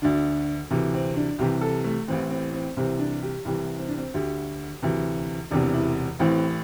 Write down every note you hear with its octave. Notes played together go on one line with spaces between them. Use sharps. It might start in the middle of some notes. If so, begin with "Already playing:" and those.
D2 D3 D4
D2 C3 E3
C4
D4
C2 C3 E3 G4
A4
A3
A1 A2 E3 C4
C4
C4
C2 C3 E3 C4
D4
G4
C2 C3 E3 E4
C4
D4
C4
D2 D3 G4
D2 C3 E3
E1 E2 C3 E3 D4
E4
A1 A2 E3 C4